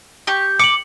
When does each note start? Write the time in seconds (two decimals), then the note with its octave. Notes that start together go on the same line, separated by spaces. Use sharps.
0.27 G4 C#6
0.59 D6 C#7 F#7